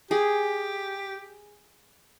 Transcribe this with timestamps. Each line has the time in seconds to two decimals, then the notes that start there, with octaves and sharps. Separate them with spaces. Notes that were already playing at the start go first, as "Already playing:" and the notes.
0.11 G4 G#4